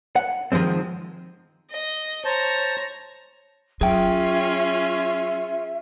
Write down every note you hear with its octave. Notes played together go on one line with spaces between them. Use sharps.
F#5
D#3 F3 F#3 G#3 C4
D#5
C5 C#5 A5 A#5
F#3 C#4 F4 G#4 E5 G5